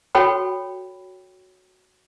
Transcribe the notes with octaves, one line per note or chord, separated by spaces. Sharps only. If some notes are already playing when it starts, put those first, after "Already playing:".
F#4 A4 C#5 G5 B5